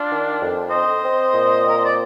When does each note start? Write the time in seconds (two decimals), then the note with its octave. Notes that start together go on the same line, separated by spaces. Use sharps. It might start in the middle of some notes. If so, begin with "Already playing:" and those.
Already playing: D4 F4
0.09 D#3
0.40 F2
0.71 C4 C5 D#5
1.02 C4
1.32 A#2
1.63 C4
1.69 A#4
1.77 C5
1.86 D5